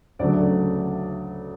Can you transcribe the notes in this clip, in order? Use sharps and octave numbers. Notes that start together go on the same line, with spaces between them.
D2 C#3 F#3 A3 D5